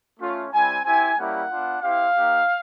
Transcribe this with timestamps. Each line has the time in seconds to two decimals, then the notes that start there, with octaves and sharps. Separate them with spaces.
0.20 A3 C#4 F4
0.52 G3 C4 E4 G#5
0.84 C4 E4 G4 G#5
1.17 G3 A#3 C#4 E4 G4 F#5
1.49 B3 D4 F4
1.82 C4 E4 G4 F5
2.15 A#3 D#4 G4